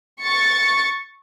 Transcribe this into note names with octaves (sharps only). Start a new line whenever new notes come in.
C#6 A6 C#7